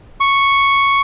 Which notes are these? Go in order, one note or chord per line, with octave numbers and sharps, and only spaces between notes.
C#6